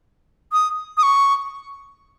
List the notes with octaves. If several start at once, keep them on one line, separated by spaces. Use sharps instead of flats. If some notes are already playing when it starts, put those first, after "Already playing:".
D#6
D#6
C#6